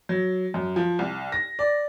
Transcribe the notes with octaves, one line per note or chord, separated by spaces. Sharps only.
F#3
F#2
F3
C2
A#6
D5